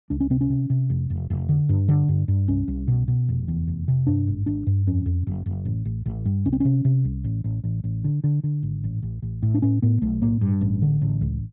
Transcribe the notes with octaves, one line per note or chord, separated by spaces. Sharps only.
C#2 D4
C#4
C3 C4
C#4
C3
C3
F1
F1
F1
D3
G2
D3
G2
G2
C2 C#4
C2
B2
B2
F1
E2
F1
C3
G2 D4
G#1
G#1 D4
G2
F2 C#4
F2
F#1
F#1
A1
A1
A1
G2
C2 C#4
C4
C3 C#4
C3
C2
A1
A1
A1
A1
D3
D3
D3
G#1
A1
A1
A1
A2
D4
A2 C#4
A2 B3
B1 A3
A2 A#3
G2
A1
D3
A1
C#2